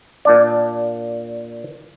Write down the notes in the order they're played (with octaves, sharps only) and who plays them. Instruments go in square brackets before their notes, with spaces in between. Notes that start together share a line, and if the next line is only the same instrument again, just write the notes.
[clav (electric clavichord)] A#2 D4 D5